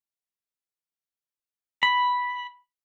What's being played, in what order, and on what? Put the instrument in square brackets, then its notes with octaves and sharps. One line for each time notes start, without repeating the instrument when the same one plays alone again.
[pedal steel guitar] B5